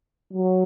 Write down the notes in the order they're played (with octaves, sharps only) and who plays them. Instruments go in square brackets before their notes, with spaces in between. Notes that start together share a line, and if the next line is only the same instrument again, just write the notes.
[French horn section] F#3